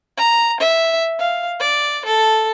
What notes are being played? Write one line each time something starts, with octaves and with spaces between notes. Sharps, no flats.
A#5
E5
F5
D5
A4